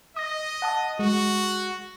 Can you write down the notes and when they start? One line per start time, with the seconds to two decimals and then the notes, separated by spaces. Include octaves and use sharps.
0.16 D#5 D#6 A#6
0.62 F#5 A5 D#6
0.99 G#3 F#4